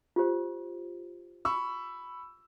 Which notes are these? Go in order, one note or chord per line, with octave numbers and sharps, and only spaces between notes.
F4 G4 C5
B5 C#6 E6